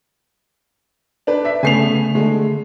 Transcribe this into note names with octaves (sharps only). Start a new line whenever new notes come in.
D4 B4
E5 B6
C#3 A3 B3 G#5 C7 F7
D3 G#3 A3